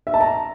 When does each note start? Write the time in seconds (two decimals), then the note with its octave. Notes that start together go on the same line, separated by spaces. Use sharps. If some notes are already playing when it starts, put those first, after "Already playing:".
0.07 E5
0.14 A5
0.21 A#5